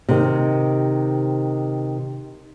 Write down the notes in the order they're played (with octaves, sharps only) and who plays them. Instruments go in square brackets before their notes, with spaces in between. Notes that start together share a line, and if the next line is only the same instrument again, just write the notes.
[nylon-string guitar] C3 D#3